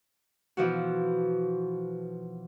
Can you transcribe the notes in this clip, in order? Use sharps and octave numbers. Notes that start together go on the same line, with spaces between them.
B2 E3 F3 F#4